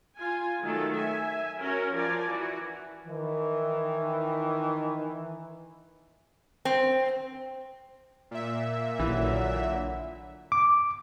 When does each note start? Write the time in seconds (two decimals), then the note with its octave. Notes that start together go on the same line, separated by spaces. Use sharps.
0.17 F4 G#5
0.63 D#3 F#3 A3 A4
0.95 E5 G#5
1.60 C#4 F#4 A#4
1.94 F3 A#4 D5 G#5
2.28 E3 F#4
3.07 D#3 E3
6.65 C4
8.31 A#2 E5
8.99 A#1 D3 E3 F#3
10.52 D6